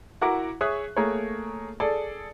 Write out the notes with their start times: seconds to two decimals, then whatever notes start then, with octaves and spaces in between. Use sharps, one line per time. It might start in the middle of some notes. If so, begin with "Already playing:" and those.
0.21 E4 F#4 A#4 F#5 A#5 D6
0.61 G#4 C#5 E5 C#6 D#6 F#6
0.97 A3 A#3 G#4 A#4 C#5
1.80 G#4 A4 D5